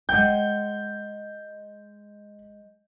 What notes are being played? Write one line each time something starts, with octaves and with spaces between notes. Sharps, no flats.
G#3 F#5 G5 G6